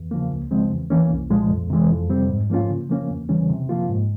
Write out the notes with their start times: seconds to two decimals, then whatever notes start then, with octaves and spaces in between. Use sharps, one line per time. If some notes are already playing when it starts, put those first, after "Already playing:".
Already playing: E2
0.11 C#3 F3 A#3
0.31 C#2
0.51 C#3 F3 G#3 C4
0.71 E2
0.90 E3 A#3 C#4
1.11 C2
1.30 A#2 F3 G#3
1.51 F2
1.70 C3 E3 G#3
1.90 F2
2.10 C3 G3 C4
2.30 G#2
2.50 F3 A#3 C#4 F4
2.70 C#3
2.90 F3 A#3 C#4
3.10 E2
3.29 C#3 E3 G3 C#4
3.49 C3
3.69 F3 A#3 F4
3.89 G#2